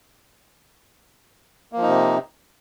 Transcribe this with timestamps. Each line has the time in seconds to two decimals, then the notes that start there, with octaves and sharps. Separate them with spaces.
1.72 A#3
1.77 F3
1.82 D#4
1.87 C3